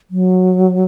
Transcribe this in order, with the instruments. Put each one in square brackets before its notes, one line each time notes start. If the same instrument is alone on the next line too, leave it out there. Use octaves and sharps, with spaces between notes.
[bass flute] F#3